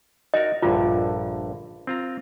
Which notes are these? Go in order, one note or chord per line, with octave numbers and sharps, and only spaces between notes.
D#4 F#4 A#4 D#5
A#1 G2 D3 F4
C4 F4 A#5